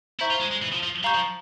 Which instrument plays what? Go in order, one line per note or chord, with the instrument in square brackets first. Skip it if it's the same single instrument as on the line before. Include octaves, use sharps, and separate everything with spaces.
[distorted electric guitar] E4 [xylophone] C5 E5 A#5 C#6 G6
[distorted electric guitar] F4
G#3
G#3
E3
F3
F3
[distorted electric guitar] G3 [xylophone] F5 A#5 C#6 G6
[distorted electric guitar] F3